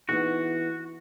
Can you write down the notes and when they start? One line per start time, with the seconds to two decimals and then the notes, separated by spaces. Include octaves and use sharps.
0.09 E3 B3 D#4 F#4 G#4